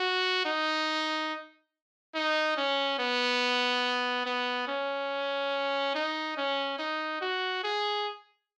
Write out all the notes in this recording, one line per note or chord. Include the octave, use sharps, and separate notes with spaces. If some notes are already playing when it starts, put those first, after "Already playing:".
Already playing: F#4
D#4
D#4
C#4
B3
B3
C#4
D#4
C#4
D#4
F#4
G#4